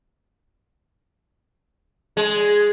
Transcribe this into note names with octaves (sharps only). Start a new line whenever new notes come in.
G#3